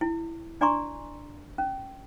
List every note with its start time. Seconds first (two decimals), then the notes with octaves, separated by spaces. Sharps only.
0.01 E4
0.61 D4 D5 G#5 A#5 C6 C#6
1.58 C#4